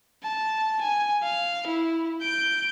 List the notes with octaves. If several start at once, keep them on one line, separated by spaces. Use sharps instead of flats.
A5
G#5
F5
E4
G6 D7